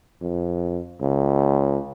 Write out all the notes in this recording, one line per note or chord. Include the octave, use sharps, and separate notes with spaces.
F2
C#2